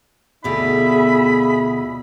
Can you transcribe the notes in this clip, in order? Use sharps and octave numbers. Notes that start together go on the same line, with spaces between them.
D2 B2 D#4 F4 G#4 D5 E5 B5